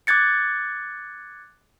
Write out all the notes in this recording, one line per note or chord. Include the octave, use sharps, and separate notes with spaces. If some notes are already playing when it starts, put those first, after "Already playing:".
D6 F#6 G#6 A6 C#7